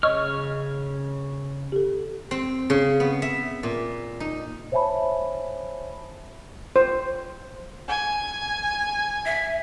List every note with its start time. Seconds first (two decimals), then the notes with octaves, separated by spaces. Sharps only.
0.03 C#3 C#5 D#5 C#6 E6 F6
1.72 G4 A4
2.31 C4
2.70 C#3
3.00 B3
3.22 E5
3.63 A#2
4.20 D#4
4.72 C5 C#5 E5 G#5 A5 B5
6.76 C5
7.88 G#5
9.26 E5